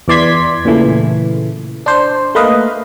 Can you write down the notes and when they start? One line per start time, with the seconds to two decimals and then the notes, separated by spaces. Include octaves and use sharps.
0.08 E2 E3 D5 C6 G#6 B6
0.65 A#2 C#3 E3 A3
1.86 D4 C5
2.35 A3 A#3 B4 D#5 F5